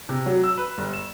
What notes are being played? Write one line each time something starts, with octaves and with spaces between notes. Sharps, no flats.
C3
F#3
E6
B4
G1
E7